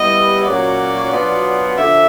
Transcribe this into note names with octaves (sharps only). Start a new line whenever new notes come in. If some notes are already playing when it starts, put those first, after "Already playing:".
Already playing: G3 B3 E4 D#5
A#2 F#3 A#3 C#4 F#4 D5
B2 F#3 B3 D4 F4
D3 F3 E5